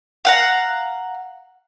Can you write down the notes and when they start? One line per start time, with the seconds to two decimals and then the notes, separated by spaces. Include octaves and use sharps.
0.25 F5 F#5 A#5